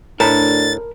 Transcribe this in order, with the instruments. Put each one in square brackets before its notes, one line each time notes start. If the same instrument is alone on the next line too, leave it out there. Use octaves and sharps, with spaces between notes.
[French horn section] D2 D4 [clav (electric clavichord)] A2 [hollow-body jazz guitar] A#4 A5 B5 [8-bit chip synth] A6